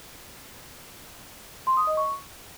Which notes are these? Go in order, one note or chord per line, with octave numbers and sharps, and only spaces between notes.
C6
D#6
D#5
C#6